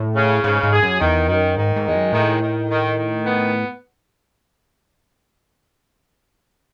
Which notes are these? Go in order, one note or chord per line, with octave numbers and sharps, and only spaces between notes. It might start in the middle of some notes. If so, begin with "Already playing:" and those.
Already playing: A2
C#3
G#2 C#3
G#2
G#4
F#2
E2 D#3
F#2 D#3
G#2 D#3
G#2
E2 G#3
F#2
A2 D#3
D#3
D#3
D#3
B3